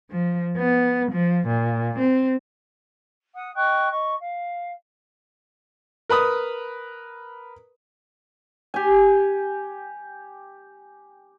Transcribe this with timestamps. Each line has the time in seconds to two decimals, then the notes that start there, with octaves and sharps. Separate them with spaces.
0.11 F3
0.57 B3
1.12 F3
1.47 A#2
1.99 C4
3.34 F#5 D#6
3.54 D#5 G5 C#6 F#6
3.90 D#5 C#6
4.19 F5
6.10 A#4 B4 B5 D#6
8.74 G4 G#5